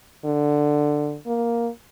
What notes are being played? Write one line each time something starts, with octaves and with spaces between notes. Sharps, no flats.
D3
A#3